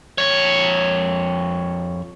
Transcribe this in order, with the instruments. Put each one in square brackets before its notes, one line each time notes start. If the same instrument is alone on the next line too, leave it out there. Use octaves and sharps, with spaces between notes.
[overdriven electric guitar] F2 C#5